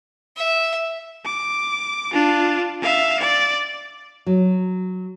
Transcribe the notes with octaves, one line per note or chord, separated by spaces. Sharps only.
E5
D6
D4 F4
E5 F5
D5
F#3